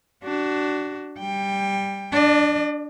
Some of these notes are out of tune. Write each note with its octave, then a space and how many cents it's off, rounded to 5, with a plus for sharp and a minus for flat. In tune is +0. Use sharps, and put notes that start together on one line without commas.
D4 +0 F#4 +25
G3 +0 G5 +20
D4 +0 D5 +45